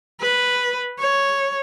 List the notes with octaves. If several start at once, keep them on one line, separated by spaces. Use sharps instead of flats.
B4
C#5